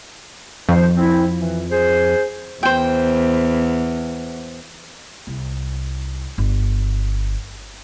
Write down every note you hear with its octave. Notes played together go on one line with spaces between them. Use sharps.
F2 D#3 C5
C4 E4
E3
G#4 C5
E2 C5 G5
C2
G1